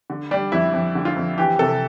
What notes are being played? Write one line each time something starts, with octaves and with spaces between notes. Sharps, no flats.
D3
G3 D4
F2 E4
F2
D3
F4
F2
E3 G4
C3 A4